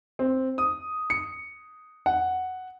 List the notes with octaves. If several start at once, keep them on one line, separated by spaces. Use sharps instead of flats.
C4
D#6
C#7
F#5